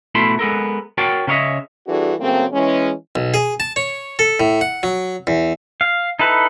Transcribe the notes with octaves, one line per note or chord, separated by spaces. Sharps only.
B2 A3 E4 A5 B5 C6
G#3 B3 A4 A#4
F#4 A#4 C#5 G5 A5
C#3 C#4 A#4 C#5 D#5 E5
E3 G3 D4 F#4 G#4 A4
C#3 F#3 A3 A#3 C4
E3 G#3 C#4
B1
G#4
A5
C#5
A4
A2
F#5
F#3
E2
F5
D#4 E4 A4 B4